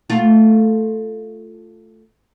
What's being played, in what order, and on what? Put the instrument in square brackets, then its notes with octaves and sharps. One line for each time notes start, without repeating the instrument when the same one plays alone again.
[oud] A3 F4